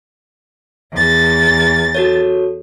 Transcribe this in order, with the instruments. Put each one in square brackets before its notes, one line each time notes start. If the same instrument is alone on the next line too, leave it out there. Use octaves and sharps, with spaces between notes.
[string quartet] E2 A6
[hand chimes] F#4 A4 C#5